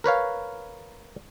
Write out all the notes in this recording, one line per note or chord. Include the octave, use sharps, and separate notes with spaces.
A#4 B4 C#5 F5